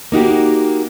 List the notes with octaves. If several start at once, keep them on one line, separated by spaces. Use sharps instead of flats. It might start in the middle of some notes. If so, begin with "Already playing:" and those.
A#3 D#4 F#4 G4